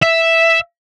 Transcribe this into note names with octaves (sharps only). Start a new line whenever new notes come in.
E5